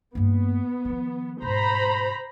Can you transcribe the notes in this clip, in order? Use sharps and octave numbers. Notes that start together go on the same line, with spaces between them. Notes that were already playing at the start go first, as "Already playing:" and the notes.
G2 A#3 B3
D#3 F3
G#2 B2 C5 A#5 B5